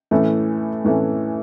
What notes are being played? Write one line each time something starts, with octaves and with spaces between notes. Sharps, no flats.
A2 E3 A3 C#4
A2 E3 A3 C#4